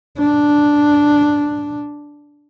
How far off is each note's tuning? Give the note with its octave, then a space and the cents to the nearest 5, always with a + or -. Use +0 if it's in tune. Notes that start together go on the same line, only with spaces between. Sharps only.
D4 -5